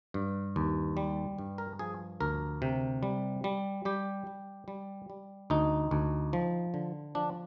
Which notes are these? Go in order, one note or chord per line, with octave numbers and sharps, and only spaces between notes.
G2
D#2
G3
G2
A#4
F3 G#4
D2 A#4
C3
G3
G3
G3 G4
G3
G3
G3
D2 D#4
D2
F3
D3
F3 D4